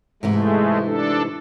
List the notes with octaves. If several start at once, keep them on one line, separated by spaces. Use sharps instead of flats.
G#2 C3 E3 G#3 A3
D4 A4